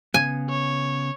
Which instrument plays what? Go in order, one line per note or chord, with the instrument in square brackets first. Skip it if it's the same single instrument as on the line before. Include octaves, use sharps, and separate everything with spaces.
[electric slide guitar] C#3 B3 [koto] G#5
[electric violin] C#5